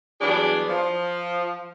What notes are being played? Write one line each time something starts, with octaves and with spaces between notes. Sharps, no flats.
E3 F#3 G3 B3 D4 G#4
F3